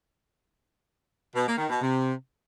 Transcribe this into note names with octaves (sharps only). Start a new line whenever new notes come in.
B2
A#3
D#3
B2
C3